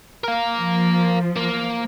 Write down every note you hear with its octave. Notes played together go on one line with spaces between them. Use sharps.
A#4 F5
F3
A#3